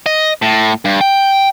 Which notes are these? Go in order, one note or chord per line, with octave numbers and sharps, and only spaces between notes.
D#5
A2
G2
G5